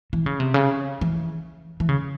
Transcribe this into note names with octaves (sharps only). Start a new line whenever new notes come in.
E3
C#3
C3
C#3
E3
E3
C#3